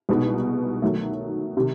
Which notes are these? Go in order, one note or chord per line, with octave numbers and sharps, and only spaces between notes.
C2 B2 G#3 B3 D#4
D#3 F#3 A3
C3 D#3